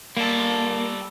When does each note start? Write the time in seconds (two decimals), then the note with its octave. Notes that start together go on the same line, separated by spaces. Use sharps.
0.17 G3 A#3 A4